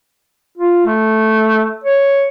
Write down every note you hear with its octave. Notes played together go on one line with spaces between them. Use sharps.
F4
A3
C#5